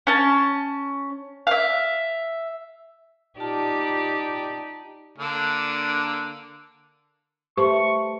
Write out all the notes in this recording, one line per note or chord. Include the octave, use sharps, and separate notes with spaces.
C#4 A5
E5 F5
D#4 F4 G4 D5 A5
D3 A#3 D4
A3 G4 B4 C5 A5 C6 C#6